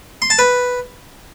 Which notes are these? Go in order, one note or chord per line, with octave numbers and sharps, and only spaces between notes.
C6
A5
B4